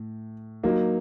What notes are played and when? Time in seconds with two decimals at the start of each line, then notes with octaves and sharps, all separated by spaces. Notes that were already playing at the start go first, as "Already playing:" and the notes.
Already playing: A2
0.63 F#3 A#3 D#4